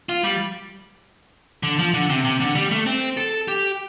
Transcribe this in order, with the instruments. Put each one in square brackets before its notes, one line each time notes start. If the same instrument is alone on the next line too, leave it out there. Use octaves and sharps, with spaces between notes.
[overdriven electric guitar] F4
G3
D3
F3
D3
C3
C3
D3
G3
A3
C4
A4
G4